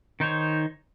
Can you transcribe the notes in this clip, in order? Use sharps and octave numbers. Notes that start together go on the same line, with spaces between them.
D#3 D#4 C5 C#5